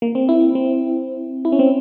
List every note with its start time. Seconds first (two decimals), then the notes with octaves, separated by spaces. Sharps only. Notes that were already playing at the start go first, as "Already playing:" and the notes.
0.02 A#3
0.15 C4
0.29 E4
0.55 C4
1.45 E4
1.52 C#4
1.59 C4